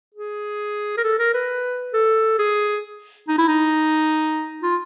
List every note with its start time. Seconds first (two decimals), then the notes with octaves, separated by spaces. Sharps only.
0.14 G#4
0.97 A#4
1.03 A4
1.19 A#4
1.34 B4
1.93 A4
2.39 G#4
3.28 D#4
3.38 E4
3.48 D#4
4.63 F4